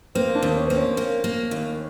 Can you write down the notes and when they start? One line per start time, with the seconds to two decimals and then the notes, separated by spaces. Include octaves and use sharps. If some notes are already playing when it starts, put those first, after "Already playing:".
0.15 A#3 C4
0.35 D4
0.42 D#2
0.55 C#4
0.67 A#3 C4
0.76 C#4
0.97 A#3
1.24 A#3
1.51 D#2